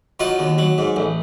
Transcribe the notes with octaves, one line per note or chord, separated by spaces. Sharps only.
F#3 D#4 F4
D#2
F#3
G#2
A1